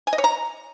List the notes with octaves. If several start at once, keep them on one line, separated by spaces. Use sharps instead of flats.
G#5
D#5
C#5
A#5